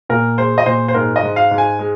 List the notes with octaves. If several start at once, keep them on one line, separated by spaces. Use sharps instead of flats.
A#2 A#4
G#3 C5
D#5
A#2 C5
C5
G#2 A#4
D#5
G#2
F5
G#2
G#5
G#3